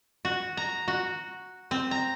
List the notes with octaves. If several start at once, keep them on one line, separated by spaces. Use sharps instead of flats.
F#4
A#5
F#4
C4
A#5